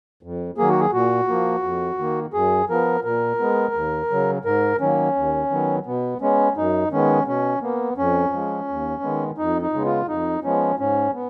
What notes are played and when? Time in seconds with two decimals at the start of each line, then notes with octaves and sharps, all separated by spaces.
0.23 F2
0.58 D#3 F#3 A#3 G#4
0.69 F#4
0.80 G#4
0.93 A#2 F#4
1.28 F3 A#3
1.63 F2
1.99 D#3 A#3
2.33 F#2 G#4
2.69 F3 B3 A#4
3.04 A#2 A#4
3.39 G#3 B3
3.74 D#2
4.10 C#3 F#3
4.45 G#2 A#4
4.81 D#3 F#3 A#3 C#4
5.15 D#2
5.50 D#3 F#3 B3
5.86 B2 B3
6.21 G#3 B3 C#4
6.56 F#2 D#4
6.92 D#3 G#3 B3 C#4
7.27 B2 C#4
7.62 A#3 B3
7.97 F2 C#4
8.33 F3 G#3
8.68 D#2
9.03 D#3 G#3 B3
9.38 F2 D#4
9.62 D#4
9.74 C#3 G#3 B3
9.85 F4
10.08 F2 D#4
10.44 F3 G#3 B3 C#4
10.79 G#2 C#4
11.14 B3